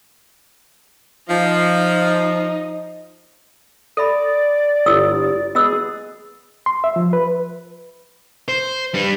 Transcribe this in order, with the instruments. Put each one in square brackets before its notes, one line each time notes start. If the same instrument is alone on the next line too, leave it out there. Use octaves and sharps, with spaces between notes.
[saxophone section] F3 [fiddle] D#4
[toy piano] A4 E5 B5 [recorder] D5
[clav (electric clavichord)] G1 [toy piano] E4 D#6 E6
[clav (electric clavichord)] B3 F#4 [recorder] G#4 [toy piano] D#5 E6
[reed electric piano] C6
E5
F3
B4
[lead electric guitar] C5
G3 B4